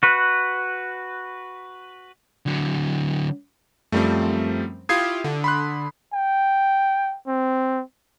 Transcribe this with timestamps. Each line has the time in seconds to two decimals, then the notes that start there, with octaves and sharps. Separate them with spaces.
0.03 F#4 B4
2.46 D3 F#3
3.92 F#2 F3 G3 A3 C4
4.89 E4 F4 G4 D#6 G#6 C7
5.24 D3
5.44 B5 C6 F#6
6.13 G5
7.27 C4